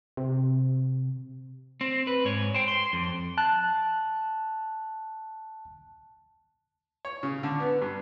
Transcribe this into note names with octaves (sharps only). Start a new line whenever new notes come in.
C3
C4
B4
G#2 C#5
C5 G5
C6
F2
A5 F#6
C#5
C#3
D3
B3
G2